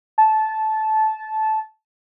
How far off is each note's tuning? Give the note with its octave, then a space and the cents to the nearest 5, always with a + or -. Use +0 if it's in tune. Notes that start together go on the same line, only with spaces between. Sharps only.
A5 -15